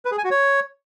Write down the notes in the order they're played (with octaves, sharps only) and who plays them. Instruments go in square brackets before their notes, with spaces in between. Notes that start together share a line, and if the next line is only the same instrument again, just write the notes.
[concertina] B4
G#4
G#5
F#4
C#5